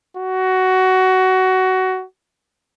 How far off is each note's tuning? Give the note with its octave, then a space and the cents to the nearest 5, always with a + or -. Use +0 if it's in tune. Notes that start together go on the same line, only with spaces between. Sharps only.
F#4 +15